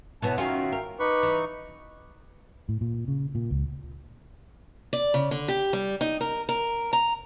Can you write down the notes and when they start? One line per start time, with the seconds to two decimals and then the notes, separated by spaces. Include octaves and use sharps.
0.22 B2 E3 B3 B4 C#5 A5
0.38 D#3 C#4 F4 F#4 E5 F5 G5
0.72 A#4
1.00 D#4 B4 C#6 D6
1.23 E3
2.69 A2
2.81 A#2
3.08 C#3
3.35 A#2
3.51 C#2
4.93 D5
5.14 C#3
5.31 D3
5.48 G4
5.73 G3
6.01 D#4
6.21 A#4
6.49 A#4
6.93 A#5